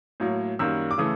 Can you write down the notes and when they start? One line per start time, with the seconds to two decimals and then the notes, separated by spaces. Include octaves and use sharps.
0.20 A2 F#3 A#3
0.59 F#2 D#3 G3 A#3 E6
0.91 D6
0.98 C#3 E3 A3 D#6